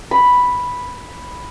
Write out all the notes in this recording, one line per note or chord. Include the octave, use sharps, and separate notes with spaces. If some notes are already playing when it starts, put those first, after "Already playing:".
B5